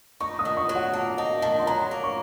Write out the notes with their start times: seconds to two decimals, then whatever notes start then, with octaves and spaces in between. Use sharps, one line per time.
0.20 D#4 C#6
0.39 D#6
0.45 D#3
0.57 C#6
0.69 F#3
0.75 F#5
0.93 A#3 A5
1.18 D#4 A5
1.42 D#3 A5
1.59 C6
1.67 F#3 A#5
1.91 A#3
2.04 C#6